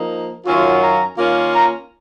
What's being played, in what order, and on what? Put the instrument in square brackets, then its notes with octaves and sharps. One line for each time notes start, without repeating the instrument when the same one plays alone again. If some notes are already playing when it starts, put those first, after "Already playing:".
Already playing: [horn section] F3 A#3 D#4
F#2 D#3 F#3 C#4 F4
A#5
D#3 A#3 C#4 F4
A#5